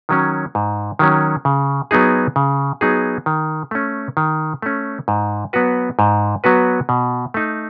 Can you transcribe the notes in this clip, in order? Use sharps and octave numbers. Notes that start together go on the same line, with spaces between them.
D#3 F#3 C#4
G#2
D#3 F#3 C#4
C#3
F#3 B3 D#4 G#4
C#3
F#3 B3 D#4 G#4
D#3
A3 C#4
D#3
A3 C#4
G#2
F#3 B3 F#4 B4
G#2
F#3 B3 F#4 B4
B2
A3 D#4